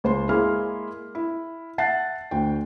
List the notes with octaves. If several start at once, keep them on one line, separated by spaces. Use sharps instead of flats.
C#2 C5 C6
G#3 A#3 E4 G#4 C6 F6
E4
E5 F#5 A5 F#6 A6 C7
D2 G5